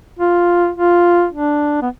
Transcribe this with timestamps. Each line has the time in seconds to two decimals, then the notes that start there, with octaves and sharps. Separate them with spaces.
0.19 F4
0.76 F4
1.32 D4
1.82 B3